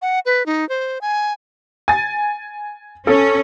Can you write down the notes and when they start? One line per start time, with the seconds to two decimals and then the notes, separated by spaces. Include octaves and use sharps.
0.02 F#5
0.26 B4
0.46 D#4
0.69 C5
1.01 G#5
1.88 G#5 A6
3.07 C#4 A4